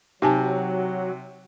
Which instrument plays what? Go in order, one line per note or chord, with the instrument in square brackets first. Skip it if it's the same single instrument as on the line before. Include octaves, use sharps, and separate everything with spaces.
[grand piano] C3 [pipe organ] F#3 [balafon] D#4 G#5 A5